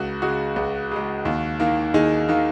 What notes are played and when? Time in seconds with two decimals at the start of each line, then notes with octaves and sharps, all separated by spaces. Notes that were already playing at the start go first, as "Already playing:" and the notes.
Already playing: C#2 F#4
0.22 C#3 G#3 F#4
0.56 C#2
0.92 C#3 G#3
1.25 D#2
1.60 D#3 A#3
1.94 D#2 D#4 G#4
2.29 D#3 A#3